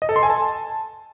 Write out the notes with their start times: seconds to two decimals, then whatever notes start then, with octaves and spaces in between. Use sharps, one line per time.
0.02 D#5
0.09 A4
0.16 C6
0.23 G#5
0.30 A5